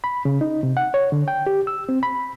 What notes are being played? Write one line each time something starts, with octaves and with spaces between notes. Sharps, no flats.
B5
C#3
D#4
C3
F#5
C#5
D3
G5
G4
E6
C4
B5